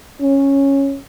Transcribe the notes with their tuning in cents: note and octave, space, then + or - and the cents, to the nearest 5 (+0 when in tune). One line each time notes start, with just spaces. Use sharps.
C#4 -10